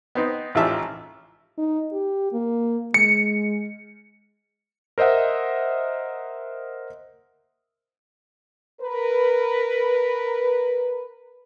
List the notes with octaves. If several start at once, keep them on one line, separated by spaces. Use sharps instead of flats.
B3 C4 D#4
A1 G#2 F4 G4 E5 A5
D#4
G4
A#3
G#3 C#7
A#4 C5 D#5 E5 F#5
A#4 B4